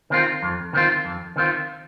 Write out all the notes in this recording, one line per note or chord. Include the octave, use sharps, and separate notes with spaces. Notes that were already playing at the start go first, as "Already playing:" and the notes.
D#3 C4 F4
F2
D#3 C4 F4
F2
D#3 C4 F4